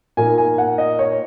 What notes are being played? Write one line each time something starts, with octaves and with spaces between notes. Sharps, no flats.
A#2 A#3 D#4 G#5
G#5
F#5
D#5
C#5